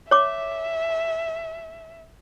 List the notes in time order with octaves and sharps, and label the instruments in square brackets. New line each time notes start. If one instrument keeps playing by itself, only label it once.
[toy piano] C#5 D6 [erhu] E5